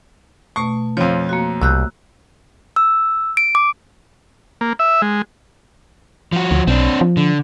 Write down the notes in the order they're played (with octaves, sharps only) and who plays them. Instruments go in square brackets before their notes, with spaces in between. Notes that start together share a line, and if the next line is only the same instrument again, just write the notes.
[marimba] B2 A3 [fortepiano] C#6
[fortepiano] F2 F3 [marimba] C#5
[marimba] A#3 F#4
[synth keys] C2 [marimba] E6 F#6 G6
[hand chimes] E6
D7
D6
[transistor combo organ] A#3
E5
G#3
[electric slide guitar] F3 F#4
[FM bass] D2
[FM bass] B1 [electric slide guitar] C4 D4
[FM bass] F3
[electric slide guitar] D3